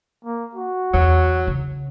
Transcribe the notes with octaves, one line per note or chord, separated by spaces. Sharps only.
A#3
F#4
E2 F#3
C#3